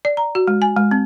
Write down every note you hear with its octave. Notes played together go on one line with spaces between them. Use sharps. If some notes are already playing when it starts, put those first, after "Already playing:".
D5
A#5
F#4
G#3
G#5
G#3
C4